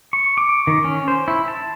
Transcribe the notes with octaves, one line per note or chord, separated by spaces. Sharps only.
C#6
D6
D#3
C#4
C5
E4
A5